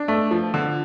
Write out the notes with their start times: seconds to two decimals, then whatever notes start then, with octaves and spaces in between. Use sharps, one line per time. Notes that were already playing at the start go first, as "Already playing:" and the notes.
Already playing: D4
0.08 A3
0.31 F3
0.54 D3